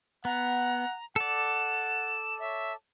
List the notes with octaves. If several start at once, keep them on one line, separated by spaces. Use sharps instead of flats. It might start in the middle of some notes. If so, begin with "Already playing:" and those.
B3 F#5 A#5
A4 D5 F#5 E7
C#5 E5